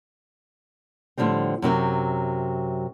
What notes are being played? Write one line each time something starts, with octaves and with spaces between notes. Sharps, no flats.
A2 D3 F3 G3 C4
F#2 C3 F#3 C4